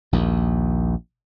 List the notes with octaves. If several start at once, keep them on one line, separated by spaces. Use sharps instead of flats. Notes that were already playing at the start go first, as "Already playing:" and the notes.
A#1 D#2